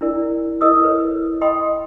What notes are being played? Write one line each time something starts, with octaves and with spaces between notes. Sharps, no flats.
D4 E4 A#4 D5
E4 A#4 D#5 D#6 E6
A4 B4 C#5
D#5 G5 B5 C6 D#6